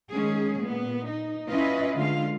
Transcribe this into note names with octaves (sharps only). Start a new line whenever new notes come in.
D#3 G#3 C#4 G#4
A#2 B3
D#4
C#4 E4 F4 B4 D#5
D3 G#3 F4 F5